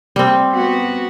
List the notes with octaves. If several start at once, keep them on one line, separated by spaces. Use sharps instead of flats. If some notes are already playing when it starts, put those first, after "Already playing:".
G3 C4
B3 F#4